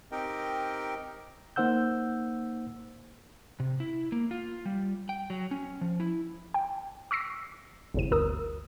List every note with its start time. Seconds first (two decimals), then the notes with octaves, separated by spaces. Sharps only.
0.12 C4 D#4 G4 A#4 D#5 G5
1.56 A#3 D#4 C5 F#5 E6 G6
3.60 C3
3.80 E4
4.12 A#3
4.31 F4
4.66 G3
5.09 G5
5.30 F#3
5.51 C#4
5.81 F3
6.00 E4
6.54 G5
7.11 C#6 E6 A#6 C7
7.94 G1 E2 C3 D#7
8.11 G1 D2 A#4 D#6 E6